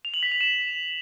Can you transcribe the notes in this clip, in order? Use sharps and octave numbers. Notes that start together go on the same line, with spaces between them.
F7
F#7
B6
F7
E7